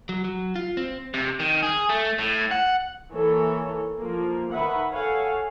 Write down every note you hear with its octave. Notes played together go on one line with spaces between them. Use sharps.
F#3
F#3
F4
C4
C3
D#3
G#4
A3
A2
F#5
E3 A#3 A4 C#5
F3 A#3
D#3 B4 E5 F#5
A4 C#5 F5 F#5 G#5